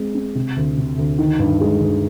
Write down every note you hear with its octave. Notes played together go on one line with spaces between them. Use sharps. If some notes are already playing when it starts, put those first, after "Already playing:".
Already playing: G#3 C4
C4
C3
D2
C3
D2
D#3
G2
G#3
G2